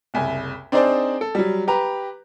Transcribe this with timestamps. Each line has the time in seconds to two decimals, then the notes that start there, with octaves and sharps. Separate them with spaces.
0.14 F#1 C2 G#5
0.72 C4 D4 D#4 G#4 C5 D5
1.21 A4
1.35 F#3 G3
1.68 G4 B4 A#5